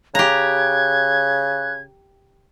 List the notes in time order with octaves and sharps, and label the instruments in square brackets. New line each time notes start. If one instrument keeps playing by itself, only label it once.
[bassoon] C#3 [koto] G4 A#5 [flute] F#6 [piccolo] G#6